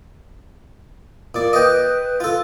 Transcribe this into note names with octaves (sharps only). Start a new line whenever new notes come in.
A#2 D5
B4 D#5 G5
F4 A4